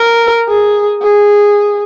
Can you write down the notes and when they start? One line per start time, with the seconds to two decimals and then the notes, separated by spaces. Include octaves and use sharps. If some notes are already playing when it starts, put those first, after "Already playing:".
Already playing: A#4
0.48 G#4
1.02 G#4